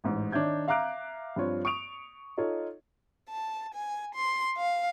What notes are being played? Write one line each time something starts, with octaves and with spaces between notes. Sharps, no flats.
A1 G#2
D#3 D4 C#5 E5 G6 G#6
E5 F5 A#5 D6 F#6 D7
G2 F3 C4 F4 C#5
C#6 D#6 D7 F7
D#4 F4 A4 C#5
A5
G#5
C6
F5